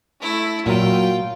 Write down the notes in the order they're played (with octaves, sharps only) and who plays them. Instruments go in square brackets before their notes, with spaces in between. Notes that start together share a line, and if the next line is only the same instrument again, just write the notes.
[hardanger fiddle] A3 E4
[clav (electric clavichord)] A#2 A#5 [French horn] F#3 [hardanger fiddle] F4 G5